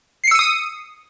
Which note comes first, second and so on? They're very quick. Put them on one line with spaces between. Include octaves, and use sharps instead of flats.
C7 C#7 E6 D#7 D#6